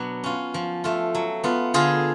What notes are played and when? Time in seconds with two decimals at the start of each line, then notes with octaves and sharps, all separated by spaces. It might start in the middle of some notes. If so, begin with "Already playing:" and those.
Already playing: B2 F#3 B3 D4
0.24 C#4 F4
0.54 F3
0.84 A3 F4
1.15 F#3
1.44 B3 F4
1.74 D3 F4 G#4